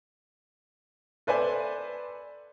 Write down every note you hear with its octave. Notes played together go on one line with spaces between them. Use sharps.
A4 B4 C5 D5 E5 G#5